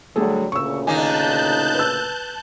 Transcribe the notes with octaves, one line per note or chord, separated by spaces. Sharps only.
D3 F#3 G3 A3 G#4 A4
D2 A#2 C#3 C#6 E6
D#3 A#3 D#4 G#5 A5 F#6 G6
B4 E6